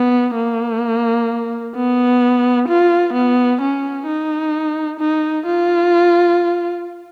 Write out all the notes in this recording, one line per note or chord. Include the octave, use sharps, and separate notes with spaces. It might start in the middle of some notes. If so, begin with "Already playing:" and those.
Already playing: B3
A#3
B3
F4
B3
C#4
D#4
D#4
F4